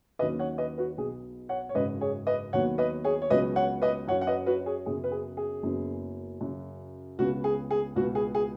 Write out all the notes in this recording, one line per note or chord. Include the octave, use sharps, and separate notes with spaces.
D#2 D#3 F#3 C#4 B4 D#5
C#5 F#5
B4 D#5
F#4 B4
B1 B2 B3 G#4
C#5 F#5
C#5
G#1 F#2 C#3 B4 D#5
G#4 C#5
B4 D#5
D#2 D#3 F#3 B3 C#5 F#5
B4 D#5
G#4 C#5
C#5
C#2 C#3 F#3 B3 B4 D#5
C#5 F#5
B4 D#5
F#2 F#3 C#4 C#5 F#5
F#5
B4 D#5
F#4 B4
G#4 C#5
F#2 C#3 B3 G#4
B4
G#4
G#4
F#1 F#2 C#3 F#3 B3
F#2 C#3 F#3
C#2 C#3 B3 F#4
G#4
G#4
C#2 B2 B3 F#4
G#4
G#4